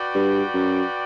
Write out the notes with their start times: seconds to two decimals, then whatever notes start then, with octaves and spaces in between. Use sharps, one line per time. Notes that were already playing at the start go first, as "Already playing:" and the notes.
Already playing: F#4 B4 D5 G5
0.15 G2
0.54 F#2